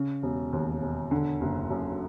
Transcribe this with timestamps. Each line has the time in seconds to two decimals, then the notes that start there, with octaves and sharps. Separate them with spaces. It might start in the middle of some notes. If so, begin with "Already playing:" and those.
Already playing: C#3
0.23 E1
0.53 D#2
0.82 E1
1.11 D3
1.41 F#1
1.70 F#2